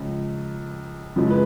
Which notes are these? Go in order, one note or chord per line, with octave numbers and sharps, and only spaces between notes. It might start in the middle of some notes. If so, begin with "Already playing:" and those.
Already playing: C#2 C#3 F3
F#2 C#3 F3 G#3
B4